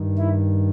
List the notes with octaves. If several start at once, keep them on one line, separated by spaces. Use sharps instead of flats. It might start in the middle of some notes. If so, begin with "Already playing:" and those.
Already playing: G2 D#3
E4